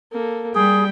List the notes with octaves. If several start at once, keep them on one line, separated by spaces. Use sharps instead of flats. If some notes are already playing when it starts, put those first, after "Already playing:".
A#3 A4
G3 G#4 G5